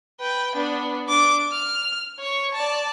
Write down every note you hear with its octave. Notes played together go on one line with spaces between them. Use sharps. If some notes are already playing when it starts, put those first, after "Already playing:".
B4 G5
B3 D4
D4 D6
F6
C#5 C#6
D5 A5